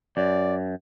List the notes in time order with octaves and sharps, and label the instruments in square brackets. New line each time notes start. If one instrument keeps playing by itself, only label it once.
[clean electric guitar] F#2 [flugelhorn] D5